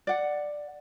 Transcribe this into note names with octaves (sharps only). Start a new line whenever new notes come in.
D5 F#5